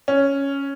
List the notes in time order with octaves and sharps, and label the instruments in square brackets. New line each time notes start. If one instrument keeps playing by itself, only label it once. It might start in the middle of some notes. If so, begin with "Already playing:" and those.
[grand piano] C#4